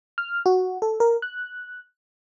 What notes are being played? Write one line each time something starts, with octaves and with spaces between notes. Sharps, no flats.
F6
F#4
A4
A#4
F#6